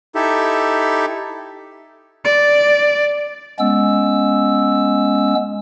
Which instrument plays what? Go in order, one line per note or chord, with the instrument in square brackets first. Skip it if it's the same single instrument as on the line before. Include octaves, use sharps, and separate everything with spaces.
[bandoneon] D#4 E4 G4 A4 E5
[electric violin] D5
[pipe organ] G#3 B3 C#4 E6